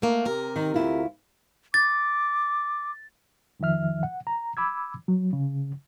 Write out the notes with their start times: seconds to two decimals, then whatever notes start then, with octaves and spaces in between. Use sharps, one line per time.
0.02 A3 A#3
0.25 C3 A#4
0.56 D#3
0.74 D2 E4 F4
1.74 D6 A6
3.60 F2 D#3 F3 E5 F6
4.03 F#5
4.27 A#5
4.57 B5 D6 E6 G#6
5.08 F#3
5.33 C#3